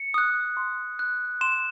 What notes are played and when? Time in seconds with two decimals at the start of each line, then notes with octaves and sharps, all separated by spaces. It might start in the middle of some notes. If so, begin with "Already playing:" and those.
Already playing: C#7
0.14 D#6 F#6
0.57 C6
0.99 F#6
1.41 C6 E7